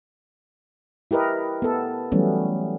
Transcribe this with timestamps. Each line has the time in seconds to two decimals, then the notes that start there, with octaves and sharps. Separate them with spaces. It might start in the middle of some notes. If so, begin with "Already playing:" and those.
1.11 E4 G4 A#4 B4 D#5
1.62 B3 A4
2.12 E3 F#3 G3 A3 B3 C#4